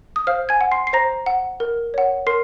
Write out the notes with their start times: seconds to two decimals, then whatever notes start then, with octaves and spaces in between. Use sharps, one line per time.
0.16 D#6
0.27 C5 F5 F6
0.49 G#5 G#6
0.61 F#5
0.72 C6 C7
0.87 C7
0.93 C5 A#5 A#6
1.26 F#5
1.60 A#4
1.94 C#5 F#5
2.27 A#4 C6 C7